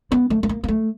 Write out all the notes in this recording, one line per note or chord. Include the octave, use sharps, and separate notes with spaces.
B3
A3
A3
A#3
A#3
A3